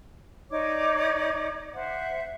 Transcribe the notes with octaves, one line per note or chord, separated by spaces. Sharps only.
D#4 C#5 D5 D6
C5 E5 F#5